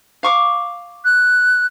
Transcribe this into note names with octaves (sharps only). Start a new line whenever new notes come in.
F5 C#6 D6
F#6